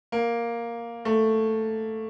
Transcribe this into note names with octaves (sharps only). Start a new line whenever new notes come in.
A#3
A3